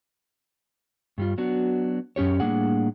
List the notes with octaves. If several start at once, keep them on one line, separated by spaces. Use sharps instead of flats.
G2 G3 F4
F#3 B3 D4 F#4
F#2 C#4 G4 C#5
A2 G3 A#3 D4 G#4 F#5